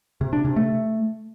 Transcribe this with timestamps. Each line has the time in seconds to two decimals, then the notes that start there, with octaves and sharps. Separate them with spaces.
0.21 C3
0.33 D4
0.45 C3
0.56 A3